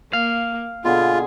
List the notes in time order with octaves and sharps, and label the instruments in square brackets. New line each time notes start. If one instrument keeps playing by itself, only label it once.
[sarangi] A#3 [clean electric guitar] F5
[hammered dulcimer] B2 D3 G#5 [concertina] F4 [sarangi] G#4